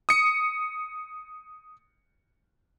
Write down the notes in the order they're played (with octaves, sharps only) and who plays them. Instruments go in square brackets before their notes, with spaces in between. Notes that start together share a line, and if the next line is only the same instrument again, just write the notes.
[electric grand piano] D#6 C#7